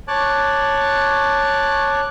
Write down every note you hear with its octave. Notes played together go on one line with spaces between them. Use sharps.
C#5 A5 D6 F#6